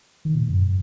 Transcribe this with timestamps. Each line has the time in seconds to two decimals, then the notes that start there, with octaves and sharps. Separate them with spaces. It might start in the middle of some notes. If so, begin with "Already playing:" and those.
0.25 D#3
0.35 A#2
0.42 G#2
0.49 F#2